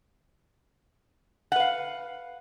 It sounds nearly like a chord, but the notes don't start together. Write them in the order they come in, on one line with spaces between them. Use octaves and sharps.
F#5 B4 F5